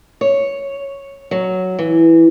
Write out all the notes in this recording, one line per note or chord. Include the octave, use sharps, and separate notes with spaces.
C#5
F#3
E3